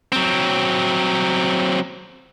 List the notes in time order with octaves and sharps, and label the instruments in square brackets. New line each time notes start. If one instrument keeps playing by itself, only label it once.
[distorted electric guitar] F#3 C4